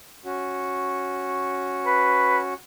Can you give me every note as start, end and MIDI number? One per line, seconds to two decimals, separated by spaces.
0.25 2.54 61
0.25 2.54 66
1.86 2.39 71